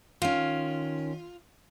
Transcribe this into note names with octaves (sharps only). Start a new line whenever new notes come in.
D#3 C#4 F4